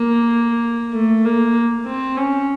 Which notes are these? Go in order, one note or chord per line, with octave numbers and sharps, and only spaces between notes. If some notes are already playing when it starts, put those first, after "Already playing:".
Already playing: A#3
A3
A#3
C4
C#4